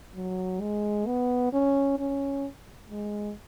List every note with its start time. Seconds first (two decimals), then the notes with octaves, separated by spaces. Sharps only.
0.16 F#3
0.61 G#3
1.07 B3
1.53 C#4
1.99 C#4
2.90 G#3